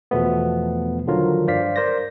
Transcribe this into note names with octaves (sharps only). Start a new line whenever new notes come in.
E2 B2 F3 A3 B3
D3 D#3 F3 F#3 F4 A#4
G2 C5 D5 F5 B6
A#4 C5 D5 A#6